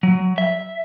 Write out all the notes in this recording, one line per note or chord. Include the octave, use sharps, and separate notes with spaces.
F#3
E5